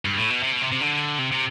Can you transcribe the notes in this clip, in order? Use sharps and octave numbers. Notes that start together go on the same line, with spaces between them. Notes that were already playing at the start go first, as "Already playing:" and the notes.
G2
A2
B2
C3
B2
C3
C3
D3
C3
C3